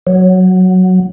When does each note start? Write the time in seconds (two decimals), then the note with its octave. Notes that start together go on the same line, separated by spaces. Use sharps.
0.07 F#3